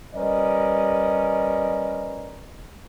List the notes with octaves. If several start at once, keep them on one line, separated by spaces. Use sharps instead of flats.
G3 C#4 A#4 B4 D5 D#5